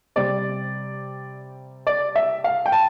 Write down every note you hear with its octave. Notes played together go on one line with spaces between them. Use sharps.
C3 G3 C4 D5
D5
E5
F5
G5
A5